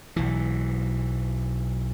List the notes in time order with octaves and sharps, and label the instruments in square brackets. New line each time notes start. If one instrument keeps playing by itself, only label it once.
[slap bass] B1 E3